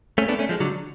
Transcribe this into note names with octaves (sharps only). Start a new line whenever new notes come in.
A3 C#4
B3 D4
A3 C#4
F3 G#3
D3 F#3